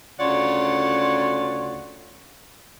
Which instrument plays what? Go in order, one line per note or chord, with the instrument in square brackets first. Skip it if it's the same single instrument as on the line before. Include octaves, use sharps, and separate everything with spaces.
[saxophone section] D2 C#3 F4 C#5 D5 F#5